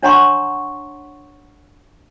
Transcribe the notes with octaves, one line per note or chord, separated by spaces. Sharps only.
D4 C#5 F#5 A#5 C6 C#6